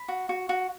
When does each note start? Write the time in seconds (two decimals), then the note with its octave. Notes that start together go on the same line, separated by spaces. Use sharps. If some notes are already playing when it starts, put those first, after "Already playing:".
Already playing: B5
0.08 F#4
0.29 F#4
0.49 F#4